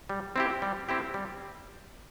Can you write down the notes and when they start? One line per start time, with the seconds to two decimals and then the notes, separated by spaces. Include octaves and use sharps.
0.09 G3
0.36 C4 E4 G4
0.62 G3
0.89 C4 E4 G4
1.14 G3